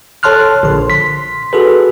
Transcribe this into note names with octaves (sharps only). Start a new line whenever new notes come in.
A4 C#5 A5 C6 F6 F#6
A#1 D3 C6
C6 B6
F#4 G#4 A4 B4